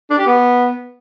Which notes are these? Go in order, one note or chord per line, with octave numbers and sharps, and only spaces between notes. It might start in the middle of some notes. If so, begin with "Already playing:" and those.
D4
G4
B3